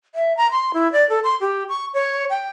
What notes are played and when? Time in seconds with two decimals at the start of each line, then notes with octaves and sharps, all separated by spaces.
0.15 E5
0.37 A#5
0.51 C6
0.74 E4
0.92 D5
1.10 A4
1.24 C6
1.41 G4
1.69 C#6
1.94 C#5
2.30 G5